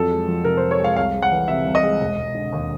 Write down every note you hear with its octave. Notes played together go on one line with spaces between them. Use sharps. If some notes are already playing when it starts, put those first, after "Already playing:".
Already playing: F2 F#3 A4
G#3
F3
C3 A#4
C5
F2
C#5
G#3 F5
C2 F5
G#3
F#5
E3
C3 E5
C2
D#5
G#3
E1
E1
D3
D#2